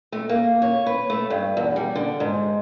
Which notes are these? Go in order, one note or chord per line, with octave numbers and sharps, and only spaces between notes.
A3
A#3
C#5
B4
A3
G2
E2
G3
D3
G#2